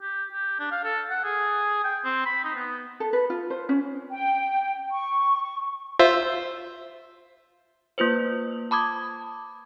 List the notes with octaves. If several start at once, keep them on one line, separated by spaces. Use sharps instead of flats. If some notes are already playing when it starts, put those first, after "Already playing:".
G4
G4
D4
F5
A4
F#5
G#4
G5
C4
B5
D#4
B3
A4
B4
F4
C5
C#4
G5
C#6
F4 C5 E5
A#3 F4 B4 C5
A5 B5 D6 D#6 G#6